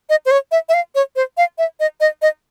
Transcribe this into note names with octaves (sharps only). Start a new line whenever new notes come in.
D#5
C5
C#5
E5
E5
F5
C#5
C5
F5
E5
D#5
D#5
D#5